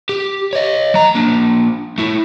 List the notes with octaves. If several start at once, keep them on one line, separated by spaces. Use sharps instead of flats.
G4
C#5 D#5
F#3 A#5
A#3 D4
A3 E4